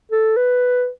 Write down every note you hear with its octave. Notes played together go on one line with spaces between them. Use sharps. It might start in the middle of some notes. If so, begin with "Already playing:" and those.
A4
B4